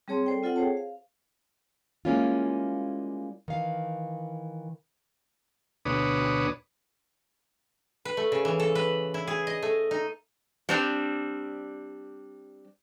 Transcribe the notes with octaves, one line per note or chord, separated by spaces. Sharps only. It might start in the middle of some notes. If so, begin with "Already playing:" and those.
G3 C4 G#4 C#5 A5 C6
A4 C5 D5 G5
C4 F4 A4 F#5 G5
G#4 C5 C#5 A5
F5
G3 G#3 A#3 C#4 E4 F4
D#3 E3 F5
D2 B2 D4 B4 C#5 D#6
B4
A3
C#3
E3
A4
B4
E4
G#4
D#5
A3
D#4
G3 C4 D4